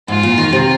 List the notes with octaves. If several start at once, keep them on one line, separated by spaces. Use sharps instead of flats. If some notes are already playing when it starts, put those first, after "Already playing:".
G#2 F4
A#2
D#3
C3